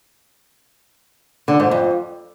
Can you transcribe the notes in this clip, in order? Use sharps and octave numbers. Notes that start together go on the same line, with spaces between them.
D3
G#2
F2